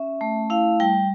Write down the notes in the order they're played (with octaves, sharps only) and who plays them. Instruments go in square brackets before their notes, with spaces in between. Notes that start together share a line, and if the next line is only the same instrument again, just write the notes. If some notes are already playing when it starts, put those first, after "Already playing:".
Already playing: [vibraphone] C#4 E5
A3
E4 F5
G3 G5